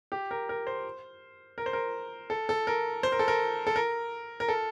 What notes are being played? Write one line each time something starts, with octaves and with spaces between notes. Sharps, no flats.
G4
A#4
A#4
C5
A#4
C5
A#4
A4
A4
A#4
C5
A#4
A4
A#4
A4
A#4
A#4
A4